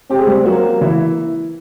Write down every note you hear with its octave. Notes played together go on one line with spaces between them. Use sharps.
C4 G4
G#4
G3 G4
F#3 A#3 F#4
E3 E4